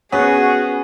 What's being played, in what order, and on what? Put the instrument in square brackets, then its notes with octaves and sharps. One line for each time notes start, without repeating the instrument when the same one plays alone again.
[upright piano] B3 [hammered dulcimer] C#4 [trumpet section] F#4 [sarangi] G#4